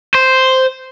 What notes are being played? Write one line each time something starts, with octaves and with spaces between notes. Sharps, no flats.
C5